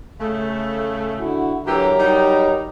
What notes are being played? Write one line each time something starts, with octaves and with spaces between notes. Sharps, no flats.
C#3 A3
D3 E4 F#4
D3 E3 F#3 G4 A#4 A#5
G3 D#4